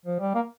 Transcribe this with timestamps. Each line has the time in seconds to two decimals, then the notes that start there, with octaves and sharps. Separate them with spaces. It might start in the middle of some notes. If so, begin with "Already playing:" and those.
0.05 F3
0.20 G3
0.35 A#3